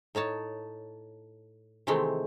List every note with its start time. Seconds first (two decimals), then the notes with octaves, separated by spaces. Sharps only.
0.15 A2 D#4 C#5 A5
1.87 C3 D#3 E3 G#3 A3 C4